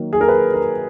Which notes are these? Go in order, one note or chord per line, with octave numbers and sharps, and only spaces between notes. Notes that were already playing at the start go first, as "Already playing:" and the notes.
Already playing: D#3 F#3 A#3
G#4
A#4
B4
A#4